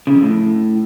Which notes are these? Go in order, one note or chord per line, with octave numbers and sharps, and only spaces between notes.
C#3
F2
A2